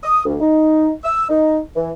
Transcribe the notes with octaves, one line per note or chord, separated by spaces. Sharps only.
D#6
D2
D#4
E6
D#4
E3